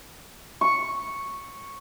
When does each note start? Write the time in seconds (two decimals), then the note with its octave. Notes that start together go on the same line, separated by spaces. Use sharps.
0.61 C#6